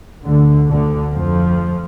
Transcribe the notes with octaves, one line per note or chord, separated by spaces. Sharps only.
D2 D3
D2 D3
F2 F3